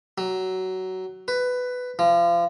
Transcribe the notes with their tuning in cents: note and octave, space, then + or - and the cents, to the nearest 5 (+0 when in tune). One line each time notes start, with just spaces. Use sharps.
F#3 +15
B4 +10
F3 -30